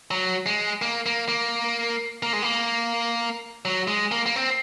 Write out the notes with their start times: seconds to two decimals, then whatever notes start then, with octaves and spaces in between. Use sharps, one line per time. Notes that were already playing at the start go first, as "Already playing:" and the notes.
0.11 F#3
0.46 G#3
0.82 A#3
1.06 A#3
1.28 A#3
2.23 A#3
2.33 G#3
2.42 A#3
3.65 F#3
3.88 G#3
4.12 A#3
4.26 A#3
4.36 C4